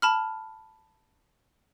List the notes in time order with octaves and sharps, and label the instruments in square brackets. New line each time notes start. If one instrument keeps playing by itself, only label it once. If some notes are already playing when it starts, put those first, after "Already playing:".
[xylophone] A5 B5 F6